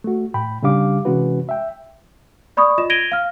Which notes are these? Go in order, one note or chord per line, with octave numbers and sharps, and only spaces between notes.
A3 F#4
A2 G5 B5
C#3 G3 D4 G4 F5 D6
C3 E3 G#3 C#4 F#4 B4
E5 G5
D5 B5 C#6 D#6
F4 D#5 E7
G#6 A#6 D7 D#7 F7 G7
F5 F6